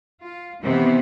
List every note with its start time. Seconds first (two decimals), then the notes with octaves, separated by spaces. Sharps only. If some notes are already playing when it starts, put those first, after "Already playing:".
0.21 F4
0.62 C3 D#3 E3 B3